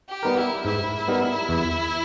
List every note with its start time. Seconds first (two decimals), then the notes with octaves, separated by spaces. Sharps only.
0.09 G4
0.23 G3 B3 D#4 A#4
0.37 E4
0.65 G#2 E4
1.08 G3 B3 D#4 A#4
1.49 E2